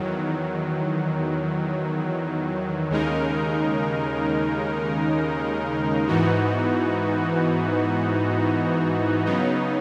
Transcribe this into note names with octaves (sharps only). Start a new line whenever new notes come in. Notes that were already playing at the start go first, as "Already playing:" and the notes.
Already playing: E2 D#3 F#3
D#2 C#3 G#3 D#4 A#4
G#2 E3 B3 D#4 F#4
C#3 F#3 B3 D#4